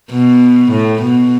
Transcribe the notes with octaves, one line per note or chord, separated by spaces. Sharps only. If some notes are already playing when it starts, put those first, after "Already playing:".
B2
A2
B2